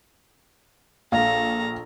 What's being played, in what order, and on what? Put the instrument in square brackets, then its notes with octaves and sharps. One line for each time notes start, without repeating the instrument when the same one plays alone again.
[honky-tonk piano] A#1 [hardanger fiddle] A4 A#5 [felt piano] F5